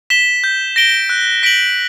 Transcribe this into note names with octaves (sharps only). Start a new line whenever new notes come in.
B6 E7 G7
G6
A#6 D7 G7
F#6
B6 D7 F#7